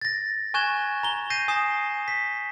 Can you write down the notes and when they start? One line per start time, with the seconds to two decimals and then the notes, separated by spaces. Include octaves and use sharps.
0.01 A6 A#6
0.54 G#5 C#6 F#6 G#6 E7 G7
1.03 A#5 G7
1.30 G6 A#6 C7 D#7
1.48 G#5 D#6 C7 E7 G7
2.08 B6